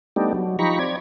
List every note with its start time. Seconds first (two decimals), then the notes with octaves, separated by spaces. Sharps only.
0.16 G3 A3 B3 D4 D#4 G4
0.34 F#3
0.59 F3 D#4 G4 A#5 B5 C#6
0.79 C4 D5 G#6